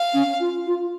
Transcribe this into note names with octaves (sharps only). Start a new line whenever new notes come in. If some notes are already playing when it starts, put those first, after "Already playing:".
Already playing: F5
C#4
F4
F4